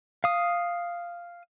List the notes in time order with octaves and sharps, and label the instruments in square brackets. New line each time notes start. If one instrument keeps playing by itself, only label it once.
[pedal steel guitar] F5 D#6